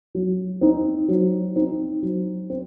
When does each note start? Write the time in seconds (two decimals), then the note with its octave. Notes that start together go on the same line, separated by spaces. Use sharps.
0.15 F#3
0.61 C4 D#4
1.08 F#3
1.56 C4 D#4
2.03 F#3
2.50 C4